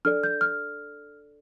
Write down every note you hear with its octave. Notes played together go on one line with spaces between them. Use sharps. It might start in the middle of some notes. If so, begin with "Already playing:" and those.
D4 A4 D5 F6
G6
F6